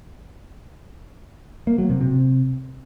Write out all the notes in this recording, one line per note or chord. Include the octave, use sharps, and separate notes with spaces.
A#3
F#3
C3
C3